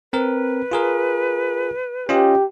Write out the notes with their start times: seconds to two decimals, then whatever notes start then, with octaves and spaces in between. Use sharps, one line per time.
0.13 C4 A#4 B4
0.71 F4 G#4 A#4
2.09 C#4 F4 G4 D#5